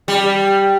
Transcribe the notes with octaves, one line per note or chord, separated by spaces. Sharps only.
G3